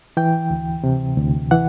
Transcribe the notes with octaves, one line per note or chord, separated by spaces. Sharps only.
E3 G5
D2
C3
D2
E3 F#5